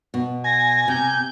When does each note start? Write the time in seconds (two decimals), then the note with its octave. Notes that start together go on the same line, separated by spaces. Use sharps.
0.14 B2
0.44 G#5 A#6
0.88 C3 G6